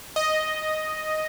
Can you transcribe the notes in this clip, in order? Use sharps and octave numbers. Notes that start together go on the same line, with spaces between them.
D#5